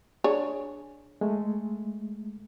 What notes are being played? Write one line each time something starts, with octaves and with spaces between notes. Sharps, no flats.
D4 G#4 C#5
G#3 A3